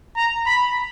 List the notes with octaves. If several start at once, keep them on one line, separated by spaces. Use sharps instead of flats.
A#5
B5